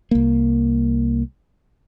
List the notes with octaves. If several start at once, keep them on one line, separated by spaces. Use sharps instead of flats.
C2 A#3